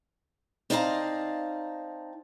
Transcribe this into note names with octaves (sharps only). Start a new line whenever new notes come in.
C4 D#4 D5 F5 A5 A#5